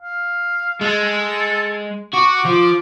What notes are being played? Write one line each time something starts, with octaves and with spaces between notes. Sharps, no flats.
F5
G#3 A4
F#4 D6
F3